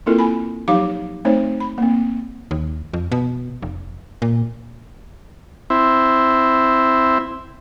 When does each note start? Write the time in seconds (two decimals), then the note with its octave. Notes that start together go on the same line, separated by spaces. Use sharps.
0.06 A#3 C4 E4 F4 A4 A#4
0.19 G#5 B5
0.68 F3 F#3 D#4 G4 F5 D6
1.25 A3 C4 D#4 C5 C#5
1.60 B5
1.78 A#3 C4
2.51 D#2
2.93 F2
3.12 B2
3.62 F1
4.22 A#2
5.70 C4 E4